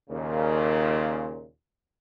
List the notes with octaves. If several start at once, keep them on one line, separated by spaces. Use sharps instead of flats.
D#2 A#2 C#3